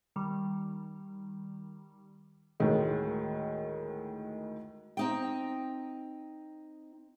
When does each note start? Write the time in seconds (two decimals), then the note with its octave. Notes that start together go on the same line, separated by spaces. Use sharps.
0.16 D#3 G3
2.60 D2 A2 D#3 G#3
4.97 C4 D#4 G5